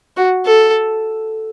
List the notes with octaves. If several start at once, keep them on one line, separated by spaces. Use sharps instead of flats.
F#4
A4